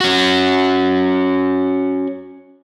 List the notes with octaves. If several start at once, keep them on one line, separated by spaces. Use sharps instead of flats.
C#4 F#4